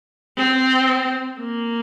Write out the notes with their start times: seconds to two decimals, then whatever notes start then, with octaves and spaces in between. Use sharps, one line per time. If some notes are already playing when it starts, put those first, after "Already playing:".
0.37 C4
1.39 A#3